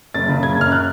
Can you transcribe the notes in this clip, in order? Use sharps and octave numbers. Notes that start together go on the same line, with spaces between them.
F#1 A6
C#3
F#1 G#6
F#2 F6
F#6